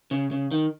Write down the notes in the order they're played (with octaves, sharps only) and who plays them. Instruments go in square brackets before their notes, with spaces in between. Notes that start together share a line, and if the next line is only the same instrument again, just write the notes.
[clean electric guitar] C#3
C#3
D#3